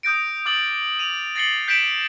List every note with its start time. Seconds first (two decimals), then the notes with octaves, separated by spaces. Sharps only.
0.03 D#6 G6 A#6 D7
0.46 D6 D#6 F6 A6 F#7
0.99 D#7 F7
1.36 A6 A#6 C7 C#7 F#7 G7
1.68 G6 B6 D7 E7 G7